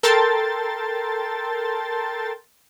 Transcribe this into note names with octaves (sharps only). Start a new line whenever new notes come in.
A4 A#4 G5 A5 C6 A6